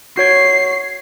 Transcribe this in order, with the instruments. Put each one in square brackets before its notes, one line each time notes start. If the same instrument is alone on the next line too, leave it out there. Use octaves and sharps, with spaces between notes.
[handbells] F#4 C#5 G#6 [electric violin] C7